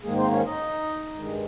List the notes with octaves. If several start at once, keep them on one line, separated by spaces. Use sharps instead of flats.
G#2 D#3 G#3 A#3 G#4
C4 C5
C#4 C#5
D#4 D#5
G2 D#3 G#3